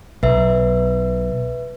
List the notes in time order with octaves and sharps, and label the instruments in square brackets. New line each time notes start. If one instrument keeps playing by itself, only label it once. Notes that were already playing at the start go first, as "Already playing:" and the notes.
[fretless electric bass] B1 [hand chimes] B4 E5